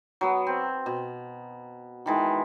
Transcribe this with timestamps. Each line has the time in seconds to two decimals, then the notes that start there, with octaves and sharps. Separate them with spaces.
0.21 F#3 B3
0.47 C4
0.86 B2
2.06 D#3 E3 G#3